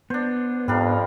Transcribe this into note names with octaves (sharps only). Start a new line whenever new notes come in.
B3 D4 C5
F2 G#2 G3 D4 A#4